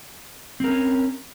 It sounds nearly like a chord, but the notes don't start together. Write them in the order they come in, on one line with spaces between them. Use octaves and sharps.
C4 A#4 C#4